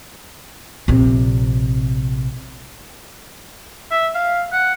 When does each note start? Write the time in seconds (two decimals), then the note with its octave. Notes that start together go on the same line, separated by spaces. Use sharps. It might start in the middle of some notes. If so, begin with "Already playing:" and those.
0.88 A#1 C3
3.91 E5
4.15 F5
4.52 F#5